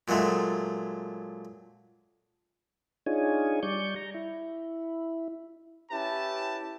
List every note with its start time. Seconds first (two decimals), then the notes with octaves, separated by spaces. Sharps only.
0.08 A#2 F#3 G#3 A3
3.06 D4 D#4 F4 G#4 C#5 G#5
3.63 G3 D5 C#6 G6
3.96 A#5
4.14 E4
5.91 C#4 E4 G4 B4 A5